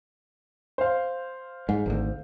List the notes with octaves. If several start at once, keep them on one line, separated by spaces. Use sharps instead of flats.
C5 F5
G#2
G#1 D2